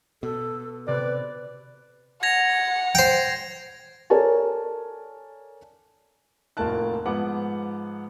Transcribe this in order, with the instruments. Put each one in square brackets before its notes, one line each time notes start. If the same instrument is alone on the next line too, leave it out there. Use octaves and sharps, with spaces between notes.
[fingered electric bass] B2 [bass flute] A4
[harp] C3 [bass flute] B4 [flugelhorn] D5
[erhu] F#5 [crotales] G#6 A#6 F7
[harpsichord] C5 G5
[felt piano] A4 A#4 C#5 D5 G#5 A5
[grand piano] F1 A2 A#3 F4 A5 F#6
G#2 F3 B3 F#5 D6